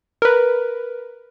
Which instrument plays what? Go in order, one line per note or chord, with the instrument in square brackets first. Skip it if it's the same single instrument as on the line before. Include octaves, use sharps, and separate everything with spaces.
[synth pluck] A#4 B4